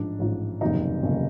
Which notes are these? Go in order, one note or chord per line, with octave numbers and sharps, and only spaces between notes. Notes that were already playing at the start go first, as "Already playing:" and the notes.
Already playing: A1 G#2 F3 D4
A1 G#2 F3
F1 D#2 C#3 F#3 D#4
F1 D#2 C#3 F#3